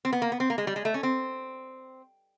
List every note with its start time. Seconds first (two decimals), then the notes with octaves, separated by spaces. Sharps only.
0.05 C4
0.13 B3
0.22 A#3
0.32 B3
0.40 C4
0.50 A#3
0.58 G#3
0.67 G3
0.76 G#3
0.85 A3
0.94 C#4
1.03 C4